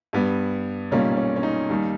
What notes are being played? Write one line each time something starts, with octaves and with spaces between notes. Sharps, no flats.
G2 G3 B3
B1 A#2 G3 A#3 C#4
C#4
C#4
D#4
D#2 D#3 G3